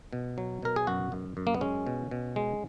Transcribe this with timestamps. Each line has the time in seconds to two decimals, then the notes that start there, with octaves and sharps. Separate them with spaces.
0.13 B2
0.38 F#3
0.62 B2 A#4
0.76 G#4
0.87 F#2 F#4
1.12 F#2
1.37 F#2
1.47 A#3
1.54 B3
1.61 G#3 C#4
1.87 B2
2.11 B2
2.36 G#3